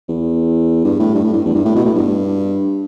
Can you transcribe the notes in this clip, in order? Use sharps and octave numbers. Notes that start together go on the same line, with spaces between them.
E2
G2
A2
G2
A2
G2
E2
G2
A2
B2
A2
G2